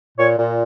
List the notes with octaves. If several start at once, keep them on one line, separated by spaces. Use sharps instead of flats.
A#2 C#5
A#2